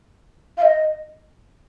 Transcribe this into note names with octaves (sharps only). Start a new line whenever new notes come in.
F5
D#5